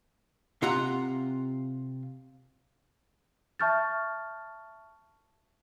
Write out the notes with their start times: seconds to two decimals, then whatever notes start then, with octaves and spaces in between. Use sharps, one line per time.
0.62 C3 F4 F#5 A#5
3.60 E5 A5 C#6 F6 G6 A6